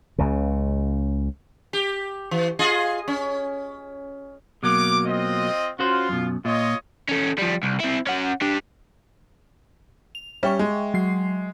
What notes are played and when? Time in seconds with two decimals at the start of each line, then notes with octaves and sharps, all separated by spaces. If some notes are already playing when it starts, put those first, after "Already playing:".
0.18 C#2 C#3
1.73 G4
2.31 E3
2.59 F4 G#4 D#5
3.08 C#4
4.63 B2 F#3 A#3 D6
5.05 C4 F4 D#5
5.79 C#4 F4 F#4 C5
6.09 F#2 B2
6.45 A#2 F4 C#5 D#5
7.09 C#4 A4
7.38 F3 G3
7.63 C2
7.80 C4 E4
8.07 C#4 F#5
8.41 G3 D4
10.15 F7
10.43 G3 C#4 E5 G5 C#6
10.59 G#3
10.94 F#3 C7